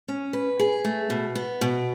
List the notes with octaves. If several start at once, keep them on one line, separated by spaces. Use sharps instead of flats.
C#4
B4
G#4
A3
B2
B3
B2